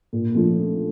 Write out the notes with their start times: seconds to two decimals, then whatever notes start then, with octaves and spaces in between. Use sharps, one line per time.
0.13 A#2
0.35 F3 A3 D4 F4